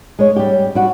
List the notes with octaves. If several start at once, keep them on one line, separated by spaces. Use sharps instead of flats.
G#3 C#5
G3 G4
G3 F#4